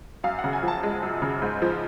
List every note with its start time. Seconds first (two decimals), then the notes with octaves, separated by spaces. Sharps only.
0.24 F#2 F5
0.39 F#5
0.44 C#3
0.53 G#5
0.63 F3 A5
0.83 G#3
1.03 F#2
1.22 C#3
1.42 G#2
1.62 F3